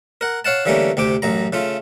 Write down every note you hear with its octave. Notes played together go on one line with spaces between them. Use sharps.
A#4 F#5
C#5 F5 F#5 A5
D3 E3 G3 A3 A#3 C#4
D2 C3 G4 D6
A1 F#2 A#5
C#3 A3 F4